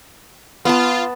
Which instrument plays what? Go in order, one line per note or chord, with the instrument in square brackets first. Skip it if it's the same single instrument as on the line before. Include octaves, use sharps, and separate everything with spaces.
[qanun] B3 A5 [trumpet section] F4